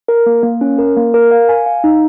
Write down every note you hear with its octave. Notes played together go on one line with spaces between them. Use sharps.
A#4
A#3
A#3
C#4
A#4
A#3
A#4
F5
G#5
F5
D#4